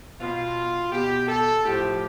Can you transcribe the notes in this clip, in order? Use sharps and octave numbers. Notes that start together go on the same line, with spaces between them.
B2 F4
B2 G4
A4
A2 F3 G4